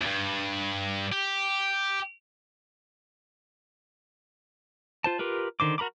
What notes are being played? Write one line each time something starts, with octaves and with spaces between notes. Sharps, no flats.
E2 G2
G4
F4 C5 A5
F4 G4 A#4 B4
D3 D#3 C5 D6
F#4 A#4 A#5 B5 D6